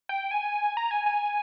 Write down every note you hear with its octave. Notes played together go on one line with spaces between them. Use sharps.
G5
G#5
A#5
G#5
G#5